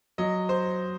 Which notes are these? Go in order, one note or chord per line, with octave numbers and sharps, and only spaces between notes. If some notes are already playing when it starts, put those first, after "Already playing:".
F#3 D#5
C5